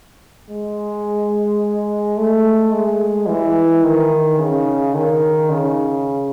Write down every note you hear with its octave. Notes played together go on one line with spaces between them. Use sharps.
G#3
A3
G#3
E3
D#3
C#3
D#3
C#3